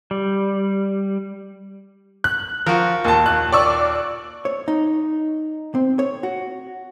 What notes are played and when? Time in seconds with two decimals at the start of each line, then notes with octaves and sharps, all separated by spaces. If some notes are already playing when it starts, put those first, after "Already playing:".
0.11 G3
2.24 F#6
2.66 F3 F#4 A#4
3.04 D#2 A#2 A5
3.26 D#2 F#6
3.52 D5 C#6 E6
4.45 C#5
4.68 D#4
5.75 C4
5.99 C#5
6.23 F#4